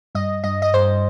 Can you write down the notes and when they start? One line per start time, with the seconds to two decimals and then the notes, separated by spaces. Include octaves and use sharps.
0.15 G2 D#5
0.44 G2 D#5
0.62 D#5
0.73 G2 C5